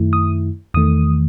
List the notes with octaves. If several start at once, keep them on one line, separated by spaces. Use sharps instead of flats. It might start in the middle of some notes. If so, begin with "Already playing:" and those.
Already playing: F#2 D#3 A3 E4
D#6
E2 D#3 A3 D#6